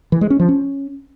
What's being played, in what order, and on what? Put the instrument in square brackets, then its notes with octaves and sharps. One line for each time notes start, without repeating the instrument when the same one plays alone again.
[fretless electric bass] E3
G#3
C#4
F3
C#4